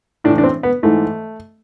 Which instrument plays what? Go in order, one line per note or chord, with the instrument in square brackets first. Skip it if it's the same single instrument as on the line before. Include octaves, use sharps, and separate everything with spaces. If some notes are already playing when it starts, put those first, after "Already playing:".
[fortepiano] A2 D4
E3
D4
C4
B3
G#2 E3 A3